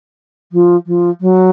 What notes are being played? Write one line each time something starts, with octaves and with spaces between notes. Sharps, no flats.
F3
F3
F#3